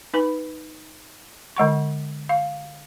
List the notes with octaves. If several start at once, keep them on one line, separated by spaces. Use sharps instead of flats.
D#4 B4 B5
D3 G#3 F#5 C#6
F5